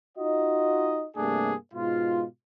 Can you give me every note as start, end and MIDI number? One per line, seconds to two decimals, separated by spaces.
0.18 1.06 63
0.18 1.06 65
0.18 1.06 66
0.18 1.06 75
1.17 1.54 43
1.17 1.54 48
1.17 1.54 57
1.17 1.54 58
1.17 1.54 62
1.17 1.54 68
1.74 2.24 44
1.74 2.24 47
1.74 2.24 56
1.74 2.24 65